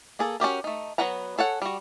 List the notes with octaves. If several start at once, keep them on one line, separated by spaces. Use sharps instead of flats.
A#3 G#4 A4
C#4 F#4 G4 A#4
A3 D#4
F#3 B3 B4 F#5 A#5
G#4 A4 C#5 F#5
G3 F#4